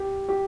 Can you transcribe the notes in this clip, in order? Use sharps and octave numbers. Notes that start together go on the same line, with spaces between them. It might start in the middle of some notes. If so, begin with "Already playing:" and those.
Already playing: G4
G4